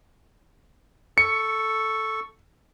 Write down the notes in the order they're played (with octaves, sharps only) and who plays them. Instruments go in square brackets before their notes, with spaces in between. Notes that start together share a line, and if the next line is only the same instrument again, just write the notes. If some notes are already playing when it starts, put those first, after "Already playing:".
[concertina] A4 C#6 [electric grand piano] C#7